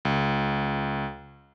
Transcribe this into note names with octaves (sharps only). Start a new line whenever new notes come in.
C#2